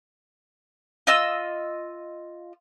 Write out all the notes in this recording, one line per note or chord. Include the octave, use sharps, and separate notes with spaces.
F4 D#5 E6